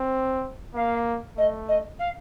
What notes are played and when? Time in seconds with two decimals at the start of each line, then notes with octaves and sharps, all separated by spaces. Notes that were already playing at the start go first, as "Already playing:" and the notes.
Already playing: C4
0.75 A#3 F5
1.37 A3 D#5
1.68 D#5
1.99 F5